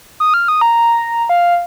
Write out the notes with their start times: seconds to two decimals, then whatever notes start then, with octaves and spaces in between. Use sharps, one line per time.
0.20 D#6
0.34 F6
0.48 D#6
0.61 A#5
1.29 F5